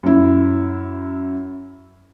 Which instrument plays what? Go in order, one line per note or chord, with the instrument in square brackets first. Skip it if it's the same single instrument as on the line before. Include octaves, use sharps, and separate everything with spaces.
[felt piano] F#2 E4